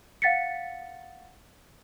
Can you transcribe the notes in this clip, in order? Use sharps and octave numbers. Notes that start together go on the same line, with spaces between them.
F5 F#5 A6 B6 C#7